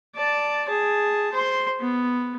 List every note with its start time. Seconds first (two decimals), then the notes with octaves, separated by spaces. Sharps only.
0.15 D5 A5
0.67 G#4 A5
1.32 C5 C6
1.80 B3